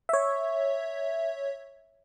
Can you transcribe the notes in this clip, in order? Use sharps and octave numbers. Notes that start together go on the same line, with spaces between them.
C#5 E5